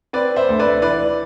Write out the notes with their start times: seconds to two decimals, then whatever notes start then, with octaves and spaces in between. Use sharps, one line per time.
0.13 C4 B4 D5
0.36 C5 E5
0.48 D2
0.60 B4 D5
0.82 E3 B4 D5